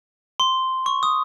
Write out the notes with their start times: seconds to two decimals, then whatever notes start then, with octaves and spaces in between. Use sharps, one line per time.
0.40 C6
0.86 C#6
1.03 D#6